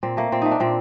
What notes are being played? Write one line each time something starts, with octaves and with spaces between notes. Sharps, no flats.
A#2 C4
A3 A#3
A#2 C4
A3 D#4
D4
A#2 C4